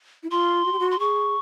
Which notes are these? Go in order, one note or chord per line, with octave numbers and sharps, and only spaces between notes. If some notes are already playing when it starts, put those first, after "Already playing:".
E4
F4 C6
F#4
G4
F#4
C6
G#4 C#6